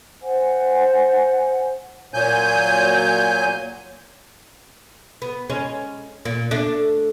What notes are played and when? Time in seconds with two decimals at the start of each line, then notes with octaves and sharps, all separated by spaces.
0.22 C5 F#5 G#5
2.14 A#2 F#3 G#5 G6
5.22 B3
5.50 G#3 C#4
6.25 A#2
6.51 A3 D4